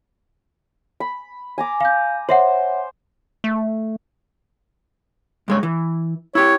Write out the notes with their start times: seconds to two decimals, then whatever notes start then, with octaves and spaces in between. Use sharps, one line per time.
1.00 B5
1.58 G#5 A#5 D6
1.81 F5 G6
2.29 C5 C#5 E5 F#5
3.44 A3
5.48 G2 G#3 C#5
5.63 E3
6.35 E4 G4 C#5